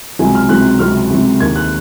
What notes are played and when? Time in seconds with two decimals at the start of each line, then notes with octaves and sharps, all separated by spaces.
0.19 C#2 C3 F#3 C4 G#5
0.35 F6
0.49 C#2 C3 F#3 C4 F#6
0.79 C#2 C3 F#3 C4 F6
1.10 C#2 C3 F#3 C4
1.40 D#2 D#3 A#3 G#6
1.56 F#6